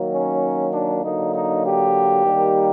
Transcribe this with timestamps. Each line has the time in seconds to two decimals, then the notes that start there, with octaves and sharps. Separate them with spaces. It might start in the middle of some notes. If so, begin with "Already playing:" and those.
Already playing: D#3 F#3 A#3
0.11 C#4
0.72 D4
1.03 D3 F#3 A#3 D#4
1.33 D#4
1.64 G4
2.25 D#3 G3 A#3